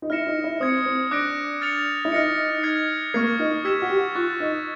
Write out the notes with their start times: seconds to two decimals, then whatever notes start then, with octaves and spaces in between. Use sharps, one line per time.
0.02 D#4
0.10 E4 F6 A#6 C#7 E7
0.27 D#4
0.44 E4
0.60 C4 D#6 G#6 C#7
0.86 C4
1.11 D4 D6 F#6 A#6 D7
1.61 F6 A6 C#7 F7
2.05 E4
2.12 D#4 F6 A#6 C#7
2.63 F6 G#6 C7
3.14 A#3 C#6 F6 G#6 C7
3.39 D#4
3.64 G4 E6 G#6 B6 E7
3.82 F#4
3.90 G4
4.15 F4 C#6 F#6 A6
4.40 D#4